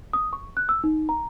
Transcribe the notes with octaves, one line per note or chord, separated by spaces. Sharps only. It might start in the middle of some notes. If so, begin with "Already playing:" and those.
D#6
C#6
F#6
E6
D#4
A#5